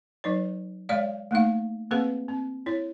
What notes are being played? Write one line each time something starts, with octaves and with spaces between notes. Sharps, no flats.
F#3 D#4 B4 C#5
G#3 C#5 D5 F5
A3 A#3 D#4 F5
A#3 C4 G#4 B4 F5
C4
E4 C#5